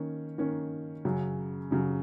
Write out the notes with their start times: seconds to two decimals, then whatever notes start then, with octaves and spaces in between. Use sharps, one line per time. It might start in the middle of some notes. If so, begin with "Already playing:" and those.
Already playing: D#3 A#3 C#4
0.38 D#3 A#3 C#4
1.05 F#2 C#3 F#3
1.71 F#2 C#3 F#3